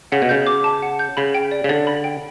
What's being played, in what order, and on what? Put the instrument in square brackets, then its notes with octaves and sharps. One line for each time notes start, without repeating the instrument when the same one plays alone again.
[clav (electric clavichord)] C#3 [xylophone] F#5
[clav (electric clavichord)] B2
[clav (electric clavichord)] C#3 [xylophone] G6
[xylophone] D6
A5
F#5
G6
[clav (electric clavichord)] C#3 [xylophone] B5
[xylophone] G5
D5
[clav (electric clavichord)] C#3
[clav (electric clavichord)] D3 [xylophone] D5
[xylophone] B5
G5